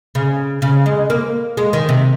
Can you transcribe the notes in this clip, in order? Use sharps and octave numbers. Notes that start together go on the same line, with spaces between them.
C#3
C#3
G#3
A#3
G#3
D#3
C3